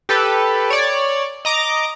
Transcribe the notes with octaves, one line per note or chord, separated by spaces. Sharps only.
G4 A4 B4
C#5 D5
D#5 A#5 D6